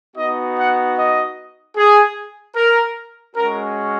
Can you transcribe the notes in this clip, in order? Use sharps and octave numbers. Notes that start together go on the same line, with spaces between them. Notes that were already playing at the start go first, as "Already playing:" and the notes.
B3 D#4 F#4 D#5
F#5
D#5
G#4
A#4
G#3 C#4 F#4 A#4